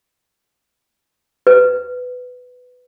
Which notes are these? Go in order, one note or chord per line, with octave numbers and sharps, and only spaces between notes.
B4